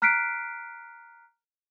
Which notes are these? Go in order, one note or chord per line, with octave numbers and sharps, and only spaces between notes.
A#5 F6 F#6 B6 C7 D7